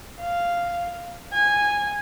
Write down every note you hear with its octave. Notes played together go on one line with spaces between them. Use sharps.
F5
G#5